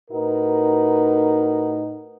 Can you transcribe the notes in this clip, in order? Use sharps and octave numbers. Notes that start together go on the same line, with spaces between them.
A2 D#4 F#4 A#4 B4